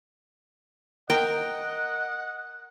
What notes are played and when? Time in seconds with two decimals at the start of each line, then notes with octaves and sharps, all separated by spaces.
1.10 A#4 D#5 F#5 G5